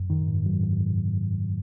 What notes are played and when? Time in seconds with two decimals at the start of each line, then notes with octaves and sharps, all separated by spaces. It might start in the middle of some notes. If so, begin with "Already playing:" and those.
Already playing: F#2
0.10 D#3
0.27 G#2
0.46 F#3
0.63 G#2